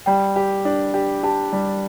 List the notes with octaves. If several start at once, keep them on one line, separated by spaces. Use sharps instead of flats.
G3 G5
G4
D4
G4
G4 A5
G3